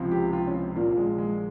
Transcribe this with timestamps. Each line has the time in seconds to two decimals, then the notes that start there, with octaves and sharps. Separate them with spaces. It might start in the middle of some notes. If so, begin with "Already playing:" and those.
Already playing: C#2 C3 F3
0.11 G4
0.33 F4
0.47 C#4
0.54 C4
0.76 A#1 A#2 F3 A#3
0.97 G#3
1.18 G#3